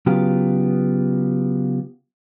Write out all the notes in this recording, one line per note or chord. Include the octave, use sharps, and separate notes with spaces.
C#3 F#3 B3 F4 G4